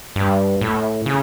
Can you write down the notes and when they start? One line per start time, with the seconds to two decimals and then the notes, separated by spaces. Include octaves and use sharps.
0.16 G2
0.61 A2
1.06 C#3